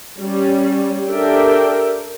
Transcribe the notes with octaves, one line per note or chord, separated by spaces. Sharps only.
G3 C#4
D4 G4 A4 A#4 E5 G5